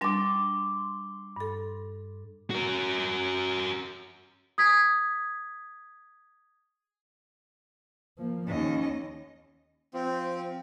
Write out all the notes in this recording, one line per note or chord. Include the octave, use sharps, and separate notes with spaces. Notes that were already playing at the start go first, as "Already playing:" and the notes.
G3 D4 C6 D6 A6
G2 A4
F#4 A#4
D#6 G#6 B6
F3 A#3
D#2 C#4 D#5
F3 C4